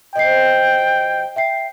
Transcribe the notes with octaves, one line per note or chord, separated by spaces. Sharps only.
B2 F3 B3 D#5 G5 C7
E5 G5 C7